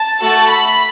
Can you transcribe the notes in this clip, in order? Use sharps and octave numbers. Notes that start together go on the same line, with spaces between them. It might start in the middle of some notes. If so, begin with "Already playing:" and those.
Already playing: A5
A3 F#4 A4
B5